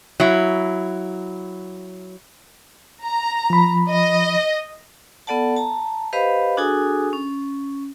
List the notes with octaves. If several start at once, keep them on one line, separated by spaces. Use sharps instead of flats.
F#3 E4
A#5
F3 B5
D#5
B3 A4 D5 F#5 A5
A5 A#5
G4 B4 C5 D#5 F5 B5
D4 F#4 G#4 A4 G#5 D#6
C#4